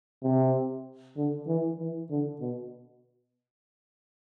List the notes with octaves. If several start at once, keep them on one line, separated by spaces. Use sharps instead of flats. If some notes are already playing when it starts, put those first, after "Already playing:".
C3
D3
E3
E3
D3
B2